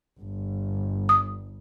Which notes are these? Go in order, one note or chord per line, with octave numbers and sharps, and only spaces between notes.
G1
D#6